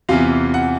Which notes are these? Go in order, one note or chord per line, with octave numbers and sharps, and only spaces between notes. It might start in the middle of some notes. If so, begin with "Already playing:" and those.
E2 C3 E3 F4 F5
F#5